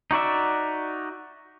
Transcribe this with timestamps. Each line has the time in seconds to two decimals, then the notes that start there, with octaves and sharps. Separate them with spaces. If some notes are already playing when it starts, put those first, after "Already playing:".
0.11 D#4 F#4 D5 E5